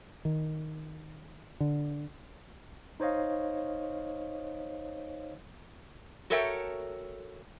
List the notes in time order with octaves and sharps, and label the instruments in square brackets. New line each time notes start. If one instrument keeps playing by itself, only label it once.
[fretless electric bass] D#3
D3
[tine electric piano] D#4 C5 C#5 D#5 F5
[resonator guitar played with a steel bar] F#4 A4 A#4 C#5 E5 G5